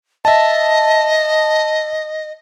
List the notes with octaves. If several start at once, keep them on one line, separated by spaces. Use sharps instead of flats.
D#5 E5 A5